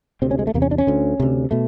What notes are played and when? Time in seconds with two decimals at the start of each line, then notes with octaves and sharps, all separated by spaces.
0.22 D2 C3 C4
0.31 C#4
0.39 G#3
0.47 A3
0.54 E2 C3 A#3
0.62 C#4
0.71 D4
0.78 C#4
0.87 D2 D3
1.20 D2 C3
1.51 B2 A3